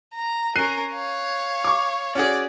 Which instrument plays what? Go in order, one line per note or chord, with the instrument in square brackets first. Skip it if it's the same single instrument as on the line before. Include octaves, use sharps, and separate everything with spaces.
[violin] A#5
[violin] C#4 A#4 [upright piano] F#6 C7 D#7
[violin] C#5 F5
[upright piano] C#6 D6
[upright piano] C#4 F#4 G#4 [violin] D5